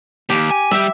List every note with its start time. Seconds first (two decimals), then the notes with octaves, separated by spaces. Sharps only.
0.30 D#2 G4
0.51 G#5
0.71 G3 G4 E5